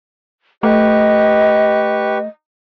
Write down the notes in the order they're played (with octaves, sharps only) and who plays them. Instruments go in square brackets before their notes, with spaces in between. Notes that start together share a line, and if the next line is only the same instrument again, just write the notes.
[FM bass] A3 [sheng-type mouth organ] G4 B4 C#6 [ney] D#5